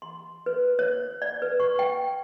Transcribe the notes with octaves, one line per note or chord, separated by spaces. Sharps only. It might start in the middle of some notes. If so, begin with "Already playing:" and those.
C6
B4
C#5
D5
B4
C#6
G5